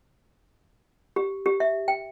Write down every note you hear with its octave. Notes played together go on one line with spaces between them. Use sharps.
G4
G4
E5
G5